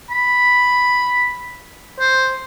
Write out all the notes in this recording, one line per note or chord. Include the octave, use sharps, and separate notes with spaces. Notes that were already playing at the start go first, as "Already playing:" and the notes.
B5
C5